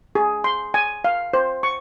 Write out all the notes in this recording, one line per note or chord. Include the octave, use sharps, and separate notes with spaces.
G#4
C6
G#5
F5
C5
C#6